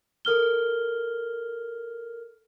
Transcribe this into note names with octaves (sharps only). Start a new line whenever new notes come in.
A4 A#4 F6 G7